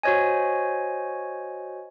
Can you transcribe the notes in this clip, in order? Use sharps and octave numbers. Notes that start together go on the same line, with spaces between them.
F#4 C5 C#5 D#5 G#5